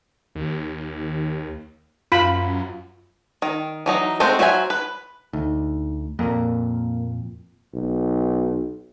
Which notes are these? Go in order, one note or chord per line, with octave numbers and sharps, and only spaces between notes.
D#2
F#2 F4 B5
D#3
E3 F#3 D#4
G#3 A3 C4 F#4 C5
F#3 F#4 C5 E5 G#5
B4
D2 D#4
F2 A#2 A#3 A#4 F5
B1